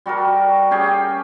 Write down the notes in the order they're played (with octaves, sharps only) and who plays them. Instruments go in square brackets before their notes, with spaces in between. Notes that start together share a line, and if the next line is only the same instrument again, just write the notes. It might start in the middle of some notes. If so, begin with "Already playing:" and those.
[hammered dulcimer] G3 F#4 A4 A#4
C#4 G4 G#4